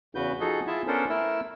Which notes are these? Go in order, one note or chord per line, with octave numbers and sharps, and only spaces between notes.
E2 C#3 F#4 B4 G6
F3 D#4 F#4 G#4 A4
E4 F4 G#4 E5 A5
B3 C#4 D4 A4 A#4 C5
A3 E4 A#4 E6